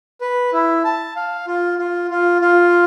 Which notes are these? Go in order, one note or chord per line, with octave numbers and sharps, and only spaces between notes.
B4
E4
A5
F5
F4
F4
F4
F4